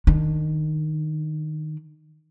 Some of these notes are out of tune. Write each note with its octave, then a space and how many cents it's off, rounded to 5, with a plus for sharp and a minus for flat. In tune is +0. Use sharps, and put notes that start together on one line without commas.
D#3 -15 D4 +0